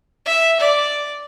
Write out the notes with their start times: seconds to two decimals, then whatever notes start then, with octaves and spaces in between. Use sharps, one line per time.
0.26 E5
0.60 D5